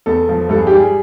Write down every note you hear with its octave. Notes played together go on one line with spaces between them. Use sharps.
E2 A4
F3
G2 A4
G#4
G4
G3 G#4